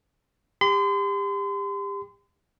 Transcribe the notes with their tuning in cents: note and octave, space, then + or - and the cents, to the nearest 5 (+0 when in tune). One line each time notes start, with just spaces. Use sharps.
G4 +30 C6 -40